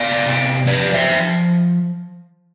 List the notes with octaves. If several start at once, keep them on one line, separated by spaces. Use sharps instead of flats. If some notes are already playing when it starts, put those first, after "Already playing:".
Already playing: B3 D5 F5
C3
F3 B4 D5
C5 E5
F3